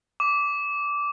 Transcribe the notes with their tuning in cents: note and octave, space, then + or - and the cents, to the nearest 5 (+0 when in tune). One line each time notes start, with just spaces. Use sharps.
D6 -15